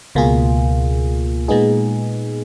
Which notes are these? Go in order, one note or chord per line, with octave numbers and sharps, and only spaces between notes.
C#2 B2 A#3 F4 G#4
A#2 G#3 B3 D#4 G#4